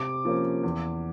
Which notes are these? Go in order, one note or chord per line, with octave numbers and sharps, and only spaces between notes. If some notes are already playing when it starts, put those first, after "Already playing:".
Already playing: C3 D6
F3 A#3 C#4
E2